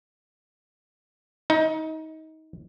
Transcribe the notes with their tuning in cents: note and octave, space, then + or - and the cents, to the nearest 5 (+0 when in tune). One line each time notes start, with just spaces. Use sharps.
D#4 +25